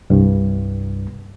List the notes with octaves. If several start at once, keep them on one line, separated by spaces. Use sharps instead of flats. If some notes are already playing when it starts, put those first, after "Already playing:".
C2 G2